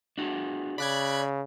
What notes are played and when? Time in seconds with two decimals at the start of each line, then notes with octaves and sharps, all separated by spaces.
0.18 D4 F#4 G#4
0.78 C#3 D5 B5 F#6 G#6